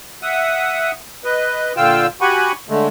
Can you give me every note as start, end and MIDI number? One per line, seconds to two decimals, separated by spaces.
0.22 0.91 76
0.22 0.91 78
0.22 0.91 87
1.24 1.73 71
1.24 1.73 75
1.77 2.07 46
1.77 2.07 50
1.77 2.07 65
1.77 2.07 77
1.77 2.07 79
1.77 2.07 88
2.21 2.52 66
2.21 2.52 67
2.21 2.52 78
2.21 2.52 80
2.21 2.52 83
2.21 2.52 85
2.69 2.88 50
2.69 2.88 56
2.69 2.88 57